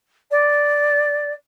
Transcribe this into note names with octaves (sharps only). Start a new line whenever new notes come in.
D5